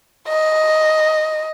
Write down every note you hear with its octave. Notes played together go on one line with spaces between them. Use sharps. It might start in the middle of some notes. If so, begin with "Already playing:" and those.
D#5